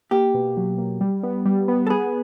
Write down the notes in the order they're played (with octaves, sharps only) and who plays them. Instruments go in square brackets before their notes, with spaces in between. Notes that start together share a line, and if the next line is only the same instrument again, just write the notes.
[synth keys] A#3 [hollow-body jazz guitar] G4
[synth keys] B2
F#3
A#3
G3
B3
G3
B3
[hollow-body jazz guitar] A4
[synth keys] B3 [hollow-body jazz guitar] G#4